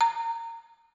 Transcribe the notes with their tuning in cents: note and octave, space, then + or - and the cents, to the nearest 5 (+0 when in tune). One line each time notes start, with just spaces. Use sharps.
A#5 -20